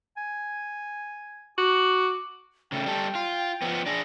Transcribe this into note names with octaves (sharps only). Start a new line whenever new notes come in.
G#5
F#4 D6
C#3 A3 G5
G3 A4
F4
F3 B3
D4 G#4 A#6